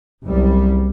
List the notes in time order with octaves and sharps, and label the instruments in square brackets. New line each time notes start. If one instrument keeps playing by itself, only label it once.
[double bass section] F#1 C2 G3